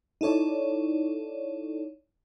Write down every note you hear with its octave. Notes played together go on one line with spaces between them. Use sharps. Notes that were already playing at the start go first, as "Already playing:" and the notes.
D#4 E4 A4 C#5 D5